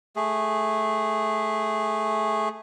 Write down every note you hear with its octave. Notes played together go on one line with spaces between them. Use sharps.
A3 G#4